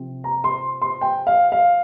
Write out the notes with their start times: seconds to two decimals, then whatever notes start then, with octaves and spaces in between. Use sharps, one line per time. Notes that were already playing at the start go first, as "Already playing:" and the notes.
Already playing: C3 F3 C4
0.24 A#5
0.44 C6
0.82 C6
1.01 G5
1.27 F5
1.52 F5